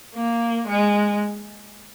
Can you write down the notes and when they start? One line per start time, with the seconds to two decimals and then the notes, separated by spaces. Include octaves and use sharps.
0.14 A#3
0.68 G#3